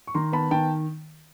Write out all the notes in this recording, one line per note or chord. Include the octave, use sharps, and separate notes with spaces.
C#6
D#3 A#5 C6
B3 A5 B5
D#3 G5 A5